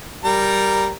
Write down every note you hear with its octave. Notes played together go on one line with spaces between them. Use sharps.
G3 A#4 A#5